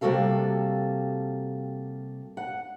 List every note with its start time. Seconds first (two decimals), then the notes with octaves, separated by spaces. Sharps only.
0.01 C3 G3 A#3 F#4 A4 F5
2.37 F#5